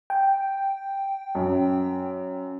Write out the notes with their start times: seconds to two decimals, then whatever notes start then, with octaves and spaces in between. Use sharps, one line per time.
0.10 G5
1.35 F#2